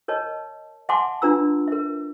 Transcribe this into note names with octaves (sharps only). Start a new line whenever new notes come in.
A#4 C#5 D#5 A5
E5 F#5 G#5 A5 C6 D6
D4 F4 B4 A#5 E6
A#4 E5